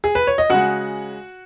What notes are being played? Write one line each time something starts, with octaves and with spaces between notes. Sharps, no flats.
G#4
B4
C#5
D#5
C#3 G#3 F#4 F#5